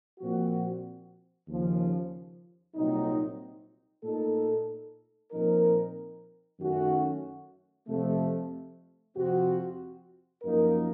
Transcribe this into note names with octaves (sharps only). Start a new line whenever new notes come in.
A#2 F3 C4 F#4
D#2 C#3 F3
C2 A#2 F#3 C4 D#4
A#2 A3 D#4 A4
A#2 F3 C4 D#4 A#4
F#2 D#3 A3 C#4 F#4
F2 C3 F3 A3
F2 C3 F3 C4 F#4
F#2 F3 A#3 D#4 A#4